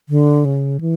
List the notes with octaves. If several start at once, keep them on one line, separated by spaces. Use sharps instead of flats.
D3
C#3
E3